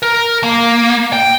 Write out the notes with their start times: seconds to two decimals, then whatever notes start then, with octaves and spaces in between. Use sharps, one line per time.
0.02 A#4
0.43 A#3
1.13 G5